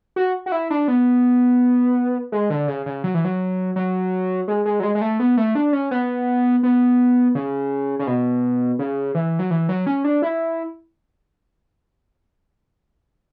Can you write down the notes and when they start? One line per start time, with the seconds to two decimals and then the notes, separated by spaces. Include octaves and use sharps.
0.16 F#4
0.46 F#4
0.52 E4
0.70 D4
0.88 B3
2.32 G#3
2.50 D3
2.68 C#3
2.86 C#3
3.04 F#3
3.14 E3
3.24 F#3
3.76 F#3
4.48 G#3
4.65 G#3
4.80 F#3
4.83 G#3
4.95 G#3
5.01 A3
5.19 B3
5.37 A3
5.55 D4
5.73 C#4
5.91 B3
6.63 B3
7.35 C#3
7.99 C#3
8.07 B2
8.79 C#3
9.14 E3
9.39 F#3
9.51 E3
9.69 F#3
9.87 C#4
10.04 D4
10.22 E4